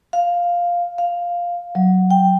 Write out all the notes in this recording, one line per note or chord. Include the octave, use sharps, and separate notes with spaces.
F5
F5
F#3
G5